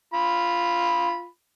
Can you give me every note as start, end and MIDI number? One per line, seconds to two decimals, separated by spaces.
0.14 1.26 65
0.14 1.26 83